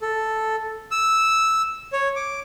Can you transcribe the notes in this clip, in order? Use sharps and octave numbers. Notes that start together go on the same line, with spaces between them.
A4
E6
C#5
D6